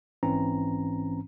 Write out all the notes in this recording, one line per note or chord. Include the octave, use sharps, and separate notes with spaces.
A#1 G#2 E3 C4 C#4 A#5